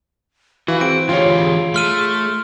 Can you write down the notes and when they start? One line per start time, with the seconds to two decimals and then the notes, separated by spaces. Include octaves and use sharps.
0.68 E3 F#4 F5
0.81 C4 G#4 D7
1.09 D3 E3 F4 G4 C#5
1.74 A3 C6 F6 D#7